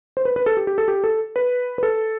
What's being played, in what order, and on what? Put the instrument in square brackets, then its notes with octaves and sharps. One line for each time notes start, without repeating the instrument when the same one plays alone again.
[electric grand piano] C5
B4
B4
A4
G4
G4
A4
G4
A4
B4
B4
A4